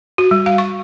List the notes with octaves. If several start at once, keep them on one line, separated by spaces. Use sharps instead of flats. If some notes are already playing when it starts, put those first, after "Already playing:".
F#4
G3
F5
C#6